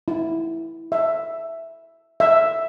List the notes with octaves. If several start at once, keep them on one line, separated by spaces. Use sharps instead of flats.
E4
E5
E5